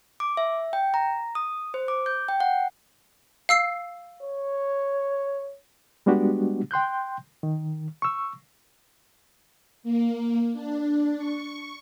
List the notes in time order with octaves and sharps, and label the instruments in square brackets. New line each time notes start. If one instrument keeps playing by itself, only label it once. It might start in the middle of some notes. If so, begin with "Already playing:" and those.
[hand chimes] D6
E5
G5
A#5
D#6
C5
D6
G6
G5
F#5
[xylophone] F5 E6 C7
[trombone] C#5
[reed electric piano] G3 G#3 B3 D4 F#4 G4
G5 C6 F#6 G6
D#3
C#6 E6
[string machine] A#3
D4
C#6